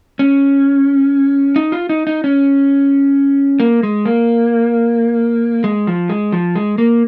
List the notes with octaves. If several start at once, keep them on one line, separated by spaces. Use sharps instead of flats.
C#4
D#4
F4
D#4
D#4
C#4
A#3
G#3
A#3
G#3
F3
G#3
F3
G#3
A#3